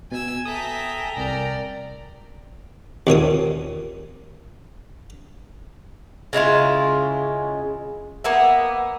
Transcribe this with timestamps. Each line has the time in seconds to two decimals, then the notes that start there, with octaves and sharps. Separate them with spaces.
0.12 B2 G#5 E6
0.45 A4 E5 G5 G#5 A#5 D#6
1.17 C2 A#4 D5
3.07 D#2 A#2 C#5 D#6
6.33 C#3 G#3 E4 F4
8.24 A#3 B3 E5